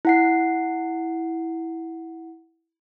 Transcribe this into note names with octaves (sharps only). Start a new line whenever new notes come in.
E4 F#5 C7